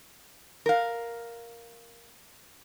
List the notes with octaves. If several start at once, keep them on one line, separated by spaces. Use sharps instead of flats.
A#4 F5